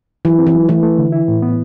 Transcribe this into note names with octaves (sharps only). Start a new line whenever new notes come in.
E3 F#3
C4
E3
F#3
E3 A3
A3
D3
E4
A2
B3